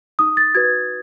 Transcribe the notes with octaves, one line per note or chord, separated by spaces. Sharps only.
D#4 D#6
A6
F#4 B4 G#6